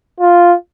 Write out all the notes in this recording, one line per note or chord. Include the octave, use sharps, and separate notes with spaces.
F4